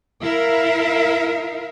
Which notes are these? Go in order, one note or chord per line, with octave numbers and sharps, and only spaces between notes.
E4 A#4 E5 F5